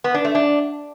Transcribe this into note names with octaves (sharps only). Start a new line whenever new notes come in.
B3
D4
A3
D4